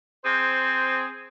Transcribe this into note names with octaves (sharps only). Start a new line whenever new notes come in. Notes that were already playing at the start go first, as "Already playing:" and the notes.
C4 G#4 C5